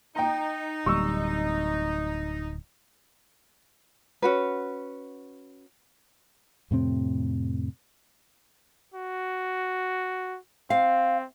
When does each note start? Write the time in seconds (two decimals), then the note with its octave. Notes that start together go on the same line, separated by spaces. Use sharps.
0.16 D#4 G5 A#5
0.86 D1 G3 C#6 E6
4.22 C#4 F#4 B4
6.71 F2 A2 C3 C4
8.94 F#4
10.70 C4 F5